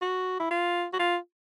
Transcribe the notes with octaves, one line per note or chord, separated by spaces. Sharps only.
F#4
E4
F4
F#4
F4